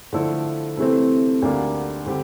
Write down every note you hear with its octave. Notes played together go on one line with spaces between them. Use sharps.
D3 F3 A3 E4 A4
C3 E3 A3 C4
D2 D3 G3 A#3 D4
D3 G3 C4 G4